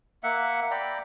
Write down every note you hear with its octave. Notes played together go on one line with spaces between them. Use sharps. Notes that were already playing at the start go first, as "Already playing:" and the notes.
A#3 E5 F#5
D5 G5 A#5 B5